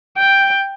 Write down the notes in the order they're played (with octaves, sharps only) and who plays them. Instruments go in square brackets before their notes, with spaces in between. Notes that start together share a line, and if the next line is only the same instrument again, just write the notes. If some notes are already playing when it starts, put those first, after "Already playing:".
[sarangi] G5